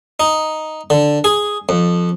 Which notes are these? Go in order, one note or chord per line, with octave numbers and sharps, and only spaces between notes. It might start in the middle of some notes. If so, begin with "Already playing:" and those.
D#4
D3
G#4
F2